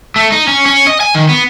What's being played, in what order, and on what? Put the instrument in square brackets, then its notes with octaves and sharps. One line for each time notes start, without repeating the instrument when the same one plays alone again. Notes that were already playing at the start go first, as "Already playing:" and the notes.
[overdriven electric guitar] A3
D#4
C#4
C#4
D#5
G#5
D#3
B3